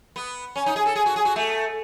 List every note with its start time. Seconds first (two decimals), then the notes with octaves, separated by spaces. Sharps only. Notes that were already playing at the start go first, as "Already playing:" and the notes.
0.16 B3
0.56 C#4
0.66 D#4
0.76 G#4
0.86 A4
0.96 G#4
1.06 F#4
1.16 G#4
1.25 F#4
1.36 A3